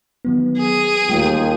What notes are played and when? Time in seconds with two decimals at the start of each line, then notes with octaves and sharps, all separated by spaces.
0.25 D#3 F#3 B3
0.57 G#4 D#7
1.10 D#2 G3 A3 F4 G5